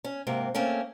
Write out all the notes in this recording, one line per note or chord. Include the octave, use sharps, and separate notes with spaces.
C#4
G#2 C3 A#3 C4
A3 A#3 C4 C#4